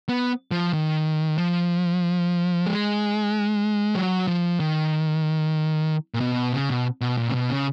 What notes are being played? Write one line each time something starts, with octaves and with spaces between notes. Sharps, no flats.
B3
F3
D#3
F3
G#3
F#3
F3
D#3
A#2
B2
C#3
B2
B2
A#2
C#3
B2
C#3